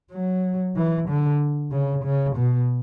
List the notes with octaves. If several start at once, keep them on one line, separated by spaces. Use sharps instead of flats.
F#3
E3
D3
C#3
C#3
B2